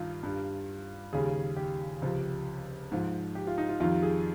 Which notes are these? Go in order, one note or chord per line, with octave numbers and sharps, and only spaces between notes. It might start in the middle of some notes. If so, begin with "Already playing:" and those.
Already playing: G2 D#3 F4
G2 G3
D#2 C#3 G3 G#4
G4
C#2 C3 F3
G#2 F3
G4
F4
D#4
F4
F2 D#3 G3 F4
G#4